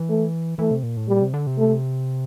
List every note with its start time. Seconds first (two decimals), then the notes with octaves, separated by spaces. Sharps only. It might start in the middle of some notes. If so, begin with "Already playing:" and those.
Already playing: E3
0.09 A3
0.59 E3 A3
0.71 C3
0.83 A#2
0.97 A2
1.08 A#2 G3
1.22 C3
1.34 D3
1.47 C3
1.58 A3